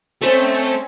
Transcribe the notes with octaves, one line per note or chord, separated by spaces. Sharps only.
A3 C4 C#4 C5 D#5